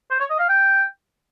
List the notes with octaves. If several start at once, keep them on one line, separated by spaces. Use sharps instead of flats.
C5
C#5
D#5
F5
G5